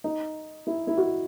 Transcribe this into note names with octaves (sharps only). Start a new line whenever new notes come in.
D#4
E4
E4
F#4